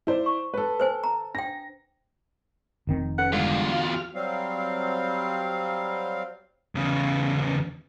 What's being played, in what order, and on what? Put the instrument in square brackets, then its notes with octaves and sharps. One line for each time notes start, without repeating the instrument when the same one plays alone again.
[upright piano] E4 C5 D5
[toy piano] C#6
[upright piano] A4 B4
[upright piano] A4 [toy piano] B4 C5 G#5
[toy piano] A#5
[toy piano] D4 G5 [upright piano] A#6
[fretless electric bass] F1 D#3 C4
[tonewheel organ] C#4 A4 B4 [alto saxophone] F#5
[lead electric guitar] E2 F4 [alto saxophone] D3 [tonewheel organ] G3 G#3
[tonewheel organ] F#4 F5 F6
[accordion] F#3 G3 C4 F5
[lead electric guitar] E2 C#3